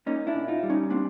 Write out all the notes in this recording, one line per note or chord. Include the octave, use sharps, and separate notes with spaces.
A#3 C#4 D#4
D4 E4
A#2
D#4 F4
G3
C#4 D#4
A#3 C4 D4